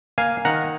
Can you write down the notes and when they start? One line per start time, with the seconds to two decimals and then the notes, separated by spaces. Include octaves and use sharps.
0.18 A#3 F5 G#5
0.45 D#3 F#5 A#5